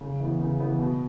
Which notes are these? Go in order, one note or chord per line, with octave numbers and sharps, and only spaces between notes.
C#3
E3 B3
C#3
E3 B3
B2